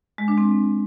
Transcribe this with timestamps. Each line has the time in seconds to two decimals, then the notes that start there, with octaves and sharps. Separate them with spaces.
0.18 G#3
0.28 D4
0.38 C4